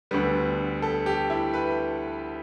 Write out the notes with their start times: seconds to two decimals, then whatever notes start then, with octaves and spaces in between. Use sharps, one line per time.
0.11 D2 D3 G3 B3
0.82 A4
1.06 G4
1.30 E4
1.54 B4